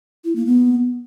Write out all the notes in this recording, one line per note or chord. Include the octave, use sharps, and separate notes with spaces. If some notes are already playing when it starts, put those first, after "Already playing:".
E4
A#3
B3